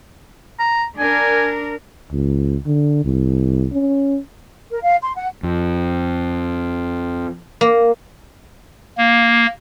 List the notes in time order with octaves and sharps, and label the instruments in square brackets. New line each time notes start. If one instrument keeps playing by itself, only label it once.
[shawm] A#5
[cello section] D4 A#4 [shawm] G#5
[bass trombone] C#2
D3
C2
C#4
[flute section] A#4
F5
C6
F#5
[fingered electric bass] F2
[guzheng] A#3
[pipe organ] A#3